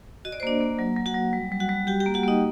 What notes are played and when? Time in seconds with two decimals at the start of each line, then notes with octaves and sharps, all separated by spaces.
0.25 F#4 D#5
0.32 D5
0.40 C5
0.43 A#3 D4 D5
0.61 A#3
0.79 F#3
0.96 F#3
1.06 F#4 F#5
1.15 F#3
1.33 G3
1.52 G3
1.60 F#4 F#5
1.69 G3
1.87 F#4 G4 G5
2.00 G4 G5
2.06 A#3
2.14 F#4 F#5
2.23 A#3 D#4 D#5